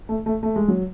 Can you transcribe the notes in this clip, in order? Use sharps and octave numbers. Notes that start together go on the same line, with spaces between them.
A3
A3
A3
G#3
F#3